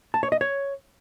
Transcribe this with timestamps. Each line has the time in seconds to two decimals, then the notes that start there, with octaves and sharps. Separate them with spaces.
0.14 A5
0.23 C#5
0.32 D#5
0.41 C#5